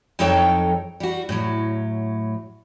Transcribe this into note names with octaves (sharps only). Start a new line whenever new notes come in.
F2 F#3 D#4 A4 C#5 G5
G3 F#4
A2 F#3